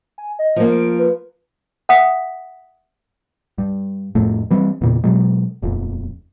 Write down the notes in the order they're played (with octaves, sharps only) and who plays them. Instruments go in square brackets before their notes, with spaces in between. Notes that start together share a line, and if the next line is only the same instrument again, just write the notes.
[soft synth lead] G#5
D#5
[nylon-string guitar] F3 A#3
[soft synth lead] D7
B4
[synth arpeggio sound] E5 F#5 D#6 B6
[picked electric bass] G2
F2 A2 A3
E3 G3 C4
E2 A#2 C#3
B2 F#3 G#3
D#1 F2